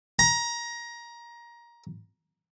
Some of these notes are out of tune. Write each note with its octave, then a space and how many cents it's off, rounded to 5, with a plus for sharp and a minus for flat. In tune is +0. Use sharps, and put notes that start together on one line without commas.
A#5 +20